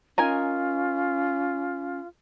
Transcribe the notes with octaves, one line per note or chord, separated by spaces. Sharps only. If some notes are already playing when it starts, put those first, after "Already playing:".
C#4 D#4 F4 A#4 G#5